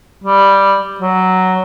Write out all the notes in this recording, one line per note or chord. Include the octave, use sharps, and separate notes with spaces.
G3
F#3